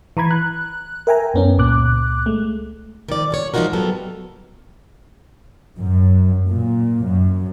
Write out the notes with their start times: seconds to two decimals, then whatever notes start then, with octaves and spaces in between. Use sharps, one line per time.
0.17 E3 A#5 B5 G#6
0.31 F#6
1.07 A#4 E5 G5 G#5 A#5
1.34 F#2 B3 C#4
1.58 C#2 A#2 D6 F#6
2.26 G#3 A3
3.09 D#3 F3 D5
3.31 F#2 A4 C#5
3.54 F3 G#3 D#4 F4 F#4 A#4
3.73 F#3 G3 B3 A4 A#4
5.78 F#2
6.47 A#2
7.06 F#2